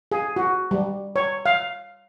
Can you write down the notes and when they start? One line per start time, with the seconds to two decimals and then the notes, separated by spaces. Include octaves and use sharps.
0.12 G#4
0.36 F#4
0.71 G3
1.16 C#5
1.46 F5